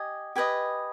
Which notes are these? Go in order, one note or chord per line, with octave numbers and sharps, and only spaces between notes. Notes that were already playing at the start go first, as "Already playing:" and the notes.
Already playing: G4 D#5 G#5
G4 B4 D#5 G#5